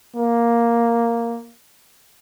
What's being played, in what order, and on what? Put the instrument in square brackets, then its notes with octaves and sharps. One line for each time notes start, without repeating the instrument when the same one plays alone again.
[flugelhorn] A#3